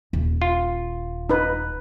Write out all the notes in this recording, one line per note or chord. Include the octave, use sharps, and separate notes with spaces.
D#1
F4
D#4 B4